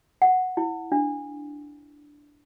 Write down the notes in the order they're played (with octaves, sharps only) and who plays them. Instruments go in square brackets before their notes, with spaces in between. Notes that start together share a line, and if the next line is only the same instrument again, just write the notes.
[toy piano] F#5
E4
D4